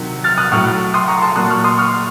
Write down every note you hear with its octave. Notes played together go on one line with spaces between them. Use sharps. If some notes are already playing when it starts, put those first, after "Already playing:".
Already playing: C3 D#3 F#3
F6 A6
D#6 F#6
A2 F#3 C#6 F6
C6 D#6
A#5 C#6
A5 C6
A#2 F#3 D#6 F#6
C#6 F6
C6 D#6
C#6 F6